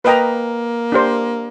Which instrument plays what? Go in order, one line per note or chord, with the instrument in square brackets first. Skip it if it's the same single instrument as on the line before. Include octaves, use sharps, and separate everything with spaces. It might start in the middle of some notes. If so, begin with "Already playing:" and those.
[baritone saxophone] A#3 [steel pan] B4 D#5 G5 A#5
[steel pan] D4 G4 C5